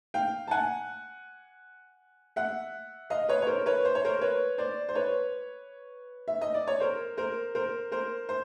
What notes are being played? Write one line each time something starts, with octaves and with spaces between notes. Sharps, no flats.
F5 G5
A5
F#5 G#5
E5 F#5
D#5 F5
B4 C#5
C#5
A#4 C5
B4 C#5
C5
C#5
A#4 C5
B4 C#5
C5 D5
C5
B4 C#5
E5
D#5
D5
C#5
A#4 C5
A#4 C5
A#4 C5
A#4 C5
C5